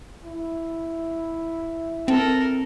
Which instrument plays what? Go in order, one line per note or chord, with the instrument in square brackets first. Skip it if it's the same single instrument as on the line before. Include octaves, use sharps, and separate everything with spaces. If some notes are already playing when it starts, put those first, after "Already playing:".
[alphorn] E4
[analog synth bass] C4 [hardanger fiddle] A4 A#4